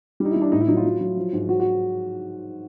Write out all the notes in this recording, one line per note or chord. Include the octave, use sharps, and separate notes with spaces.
G3
D#4
E4
G3
D4
A2 D#4
E4
F#3 D#4
F4
F#3
F#3
F3
G#2
F#3 F#4
F#4